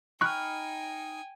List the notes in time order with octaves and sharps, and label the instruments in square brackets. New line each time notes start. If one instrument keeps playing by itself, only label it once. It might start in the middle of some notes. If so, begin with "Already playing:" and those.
[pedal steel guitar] D#4 B5 F6 [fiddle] G5 G#5 [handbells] C#6 F#6